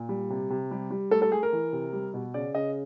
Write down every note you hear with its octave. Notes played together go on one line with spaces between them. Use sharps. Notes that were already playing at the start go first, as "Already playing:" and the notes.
Already playing: A#2
G3
C3
C3
G3
G3
A3 A4
A4
A3 G#4
A#4
E3
C3
G3
B2
C#3 D5
C#3 D#5